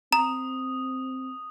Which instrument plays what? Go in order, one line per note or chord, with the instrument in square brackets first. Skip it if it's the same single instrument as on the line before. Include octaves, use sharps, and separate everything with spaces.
[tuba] C4 [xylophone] A#5 [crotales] D#6